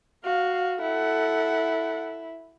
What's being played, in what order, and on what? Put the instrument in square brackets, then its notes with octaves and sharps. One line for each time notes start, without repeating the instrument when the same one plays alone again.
[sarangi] F#4 [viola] F5
[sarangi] E4 [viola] A4 F#5